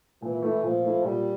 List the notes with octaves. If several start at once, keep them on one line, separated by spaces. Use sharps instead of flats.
A#2 E3
A3 E4
A#2 F3
A3 E4
A#2 G3